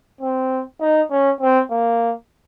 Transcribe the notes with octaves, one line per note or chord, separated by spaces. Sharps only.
C4
D#4
C#4
C4
A#3